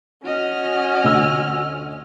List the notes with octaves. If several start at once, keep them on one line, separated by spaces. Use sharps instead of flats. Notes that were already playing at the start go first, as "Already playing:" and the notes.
C#4 F#4 D#5 F6
D2 E6